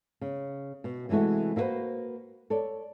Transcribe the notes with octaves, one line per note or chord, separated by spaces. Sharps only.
C#3
B2
C3 E3 G#3 A3 F#4
A#3 E4 F#4 A4 B4 C5
A4 C#5 D5